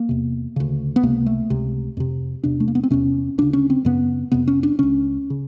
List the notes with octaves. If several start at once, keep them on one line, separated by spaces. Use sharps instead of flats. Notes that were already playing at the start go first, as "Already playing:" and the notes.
Already playing: A#3
E2 C3
D2 C#3
B3
C#2 C3 A#3
A3
C#2 C3
F2 C3
E2 C3 D4
A3
A#3
B3
C4
E2 C3 C#4
D2 C#3 D4
C#4
C4
F#2 C#3 B3
F2 C3 B3
C#4
D4
C#2 C#3 C#4
C#3